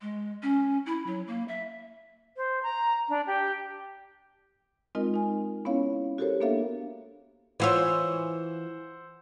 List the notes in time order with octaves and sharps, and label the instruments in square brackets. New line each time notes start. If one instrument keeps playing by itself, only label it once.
[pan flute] G#3
C#4
E4
F#3
A#3
E5
[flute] C5
A#5
D4
G4
[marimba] G#3 C4 D#4 F4 A#4 D#5
D#4 G#5
B3 C#4 E4 C#5 F5
F#4 G4 A4 A#4 C5 C#5
A#3 B3 D4 A4 E5 F5
[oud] E3 F4 C#5 [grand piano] C5 F#5 E6